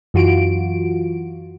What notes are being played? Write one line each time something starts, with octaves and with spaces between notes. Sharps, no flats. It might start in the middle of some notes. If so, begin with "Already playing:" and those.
F#2 E3 F4 F#4 D7